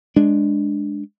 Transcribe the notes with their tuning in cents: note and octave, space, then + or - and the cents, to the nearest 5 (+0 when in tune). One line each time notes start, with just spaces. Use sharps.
G#3 +0 D4 +0